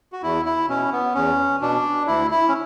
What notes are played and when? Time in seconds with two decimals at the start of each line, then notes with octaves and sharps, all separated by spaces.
0.13 F#4
0.22 E2 E4
0.45 E4
0.68 B2 C#4
0.93 B3
1.15 E2 C#4
1.61 B2 D4
2.07 D2 E4
2.31 E4
2.49 C#4